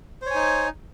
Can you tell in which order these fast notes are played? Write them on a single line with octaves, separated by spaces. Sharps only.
C5 C#5 G#5 D#4